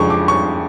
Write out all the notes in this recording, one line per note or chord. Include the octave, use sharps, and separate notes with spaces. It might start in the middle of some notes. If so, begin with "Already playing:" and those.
Already playing: F2 C#3 F3 G#3 D4 C#6
D6
C#6